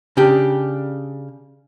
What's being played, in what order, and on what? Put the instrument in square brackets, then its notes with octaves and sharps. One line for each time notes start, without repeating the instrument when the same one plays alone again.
[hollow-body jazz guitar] C#3 D4 G4